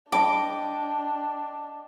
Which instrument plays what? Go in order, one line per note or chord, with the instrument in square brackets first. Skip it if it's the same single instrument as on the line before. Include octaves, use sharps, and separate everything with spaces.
[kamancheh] D4 [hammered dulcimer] D#5 G5 [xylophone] A5 B5 [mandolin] D6